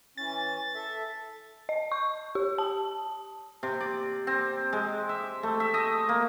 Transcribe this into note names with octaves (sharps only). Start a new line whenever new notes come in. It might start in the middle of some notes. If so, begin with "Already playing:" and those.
E3 C#4 A6
A4 E5
D#5
C#6
G4
A5
C3
D5
C4
G#3
E5
A3
E5
D#5
A#3